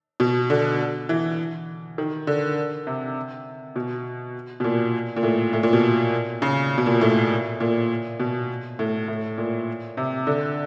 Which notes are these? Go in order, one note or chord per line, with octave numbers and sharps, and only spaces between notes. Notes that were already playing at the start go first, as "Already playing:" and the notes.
B2
D3
E3
D#3
D3
C3
B2
B2
A#2
A#2
A2
A2
A#2
B2
C#3
B2
A#2
A2
A#2
B2
A2
A2
A#2
C3
D3